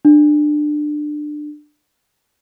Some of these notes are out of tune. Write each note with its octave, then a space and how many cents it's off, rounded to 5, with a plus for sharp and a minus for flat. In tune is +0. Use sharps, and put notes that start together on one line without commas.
D4 +25